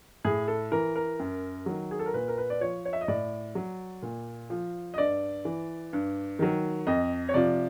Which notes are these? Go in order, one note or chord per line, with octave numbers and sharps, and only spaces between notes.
A2 G#4
A4
E3 A#4
A#4
F#2
D#3 F#3
G#4
A4
A#4
A#2 B4
A#4
B4
D5
F3 C#5
C#5
E5
D#5
A2 D5
F#3
A#2
F3
D#5
G2 D5
E3
G2
D#3 F#3
F2 D#5
C#5
C3 F3 D5